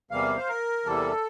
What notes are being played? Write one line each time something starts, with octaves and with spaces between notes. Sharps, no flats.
E2 C3 E3 G3 A#3 F5
C5
A#4
E2 C3 E3 G3 A#3 A4